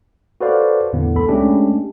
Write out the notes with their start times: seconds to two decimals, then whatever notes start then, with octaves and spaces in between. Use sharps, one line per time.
0.41 F#4 A4 B4 C5 D5 F5
0.93 E2 A2 D3 B3
1.15 C#2 A4 B5
1.29 G#3 A3 C#4 D4 G4